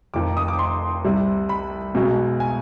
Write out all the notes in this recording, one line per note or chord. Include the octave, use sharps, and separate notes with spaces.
F1 F2 D#3 D6
D#6
D6
C6
C2 C3 G3
B5
B1 B2 G#3
G#5